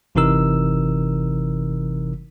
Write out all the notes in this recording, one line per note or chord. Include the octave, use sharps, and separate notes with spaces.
G1 C3 E3 D#4 A#4 E6